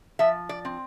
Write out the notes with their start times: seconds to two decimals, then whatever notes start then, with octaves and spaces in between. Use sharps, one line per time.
0.19 F3 E5
0.49 D5
0.65 C4